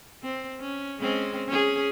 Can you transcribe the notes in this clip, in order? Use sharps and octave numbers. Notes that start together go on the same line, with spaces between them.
C4
C#4
G#3 C4 C#4
C#4 G#4